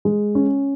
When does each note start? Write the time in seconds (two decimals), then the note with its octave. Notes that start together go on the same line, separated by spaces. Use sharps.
0.05 G#3
0.35 C#4